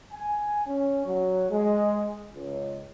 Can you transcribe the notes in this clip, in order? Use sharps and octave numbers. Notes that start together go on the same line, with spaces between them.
G#5
C#4
F#3
G#3
C#2